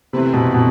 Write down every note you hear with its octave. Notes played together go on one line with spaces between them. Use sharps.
C3 E3 A3 C4 E4 B4
B2
B2